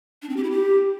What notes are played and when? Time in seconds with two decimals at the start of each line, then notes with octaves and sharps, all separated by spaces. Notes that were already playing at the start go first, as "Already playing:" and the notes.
0.22 D4
0.29 C4
0.36 G4
0.44 E4
0.51 G4